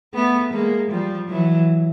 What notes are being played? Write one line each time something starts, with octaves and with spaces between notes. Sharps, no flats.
A3 B3
G#3 A#3
F3 G3
E3 F#3